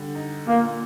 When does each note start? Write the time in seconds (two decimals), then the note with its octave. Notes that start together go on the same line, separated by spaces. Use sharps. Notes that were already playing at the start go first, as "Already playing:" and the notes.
Already playing: D3 G3
0.15 D#4
0.47 A#2 A#3